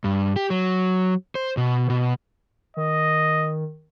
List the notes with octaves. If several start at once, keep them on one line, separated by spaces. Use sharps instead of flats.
G2
G4
F#3
C5
B2
B2
D#3 D#5